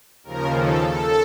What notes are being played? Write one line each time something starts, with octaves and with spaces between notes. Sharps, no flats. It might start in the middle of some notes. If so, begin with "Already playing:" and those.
D#2 C#3 F3 A#4
A4
A4